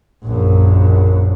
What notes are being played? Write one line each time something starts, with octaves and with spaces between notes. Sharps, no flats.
A#1 F#2